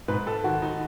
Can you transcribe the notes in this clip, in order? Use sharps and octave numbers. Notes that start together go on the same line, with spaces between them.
G#2 B4
A4
D#3 F#4
D#4